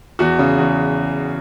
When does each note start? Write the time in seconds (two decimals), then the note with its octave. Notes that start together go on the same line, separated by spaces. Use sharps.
0.19 E2 F#4
0.39 C#3
0.58 E2